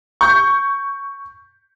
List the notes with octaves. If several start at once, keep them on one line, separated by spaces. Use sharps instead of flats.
C#6 G6